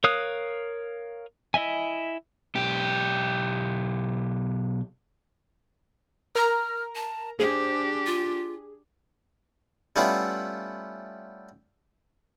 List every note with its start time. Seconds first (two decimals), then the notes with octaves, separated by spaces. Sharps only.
0.04 A#4 C#5 F5 D#6 F#6
1.54 E4 D#5 E5 G#5
2.55 B1 G4
6.35 A#4 A#5 F6
6.95 A5
7.40 D4 G4 G#4 C5
8.06 F4
9.96 G3 A3 B3 C#4 E4 F4